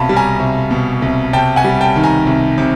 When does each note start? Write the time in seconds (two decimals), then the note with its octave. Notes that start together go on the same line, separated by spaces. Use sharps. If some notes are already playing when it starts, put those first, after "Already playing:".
Already playing: C2 B2 F5 A5 B5
0.09 G3
0.16 G#5 A#5
0.40 C2
0.71 B2
1.02 C2
1.33 C3 G5 A5
1.56 F#5 G#5
1.64 G3
1.81 G5 A5
1.96 D#3
2.03 G#5 A#5
2.26 C2
2.58 C3